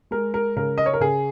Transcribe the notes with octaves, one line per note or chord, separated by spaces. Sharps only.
G#3 A#4
A#4
C#3 A#4
D#5
C#5
A#4
C#3 G#4